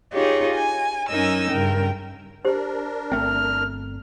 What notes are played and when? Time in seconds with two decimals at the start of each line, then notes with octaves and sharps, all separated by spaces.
0.12 D#4 F4 G4 G#4 C#5
0.54 G#5
1.09 F#2 C#4 D#4 A#4 G#5 E6
1.51 G2 C#3 A#4 G5
2.45 D4 G4 A#4 C5
3.12 G1 A3 C4 F6